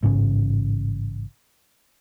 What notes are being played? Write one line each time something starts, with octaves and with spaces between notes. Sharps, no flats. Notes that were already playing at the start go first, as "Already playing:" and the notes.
A1 G#2 C#3 C#4